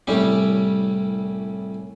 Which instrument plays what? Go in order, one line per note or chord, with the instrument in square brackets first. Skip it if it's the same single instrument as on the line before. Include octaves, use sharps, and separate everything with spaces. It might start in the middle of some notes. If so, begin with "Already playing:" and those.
[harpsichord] C2 A2 G3 C#4 G4